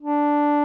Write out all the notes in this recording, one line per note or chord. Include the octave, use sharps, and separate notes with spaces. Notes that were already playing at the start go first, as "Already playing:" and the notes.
D4